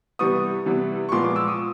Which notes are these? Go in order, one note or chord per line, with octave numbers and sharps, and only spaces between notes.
C3 E3 G3 B3 C#6 D#6
C3 E3 G3 B3
C#6
A#2 F3 G#3 B3 C6 D6
C6 D6
D6 E6
C#6 D#6